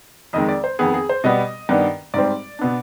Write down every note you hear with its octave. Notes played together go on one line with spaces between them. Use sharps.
F2 D#3 G#3 D#5
D5
C5
F2 D#3 B3 G#4
G#4
C5
B2 G3 B3 D#5
G2 D#3 B3 D4
G#2 G3 C4 D5
B2 B3 D4